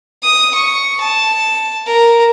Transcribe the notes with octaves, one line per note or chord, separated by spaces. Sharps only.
D#6
C#6
A5
A#4